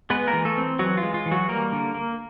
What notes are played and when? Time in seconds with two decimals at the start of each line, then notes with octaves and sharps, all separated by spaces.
0.10 G#3 B3 B4
0.27 A#3 A#4
0.33 E3
0.45 A3 A4
0.57 C4
0.79 E3 F#3 F#4
0.97 F4
1.03 G#3
1.14 F4
1.26 E3
1.31 F#3 F#4
1.49 G3 A#3 A#4
1.72 D3
1.94 A#3